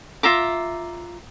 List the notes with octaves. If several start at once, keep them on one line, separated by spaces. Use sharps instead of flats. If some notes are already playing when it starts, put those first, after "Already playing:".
F4 E5 A#5 D6